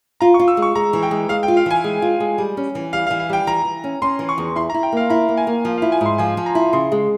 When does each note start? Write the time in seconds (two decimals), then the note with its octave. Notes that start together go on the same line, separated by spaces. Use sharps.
0.21 F4 A#5
0.34 C#6
0.40 F4
0.48 E6
0.57 G#3
0.62 C#6
0.75 G#3 A#5
0.93 E3
1.03 G5
1.11 G#3
1.29 G#3 F5
1.43 G5
1.48 F4
1.57 F5
1.66 E3 G#5
1.84 G#3
2.02 F4
2.20 G#3
2.38 G3
2.57 C#4
2.75 E3
2.93 G3 F5
3.07 F5
3.11 E3
3.19 F5
3.30 G3 G5
3.47 E3 A#5
3.65 E3
3.84 C#4
4.02 C#4 C6
4.19 E3
4.29 C#6
4.38 E2
4.56 E4 C6
4.70 A#5
4.74 E4
4.83 G5
4.92 A#3 F5
5.10 E4 A#5
5.29 A#3
5.37 G#5
5.47 A#3
5.65 F3 F5
5.78 F5
5.82 E4
5.92 G#5
6.01 G#2 C6
6.18 F3 G#5
6.37 F3
6.46 A#5
6.55 E4
6.73 C#3 C6
6.92 G#3